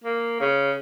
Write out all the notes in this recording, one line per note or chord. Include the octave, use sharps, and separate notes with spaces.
A#3
C#3